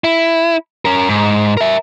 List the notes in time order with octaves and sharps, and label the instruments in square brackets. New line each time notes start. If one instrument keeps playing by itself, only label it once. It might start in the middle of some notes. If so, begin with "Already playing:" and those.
[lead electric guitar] E4
C#4 A#4
G#2
A#4 E5